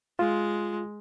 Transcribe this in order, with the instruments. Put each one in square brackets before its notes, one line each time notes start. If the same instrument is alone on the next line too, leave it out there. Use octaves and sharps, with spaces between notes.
[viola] G#3 [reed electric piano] F4